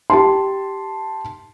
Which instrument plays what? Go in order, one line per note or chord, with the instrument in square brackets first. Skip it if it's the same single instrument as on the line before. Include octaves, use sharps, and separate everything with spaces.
[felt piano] G4 A5 C6